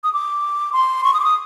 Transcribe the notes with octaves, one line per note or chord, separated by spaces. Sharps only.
D#6
D6
C6
C#6
D#6
D6
D#6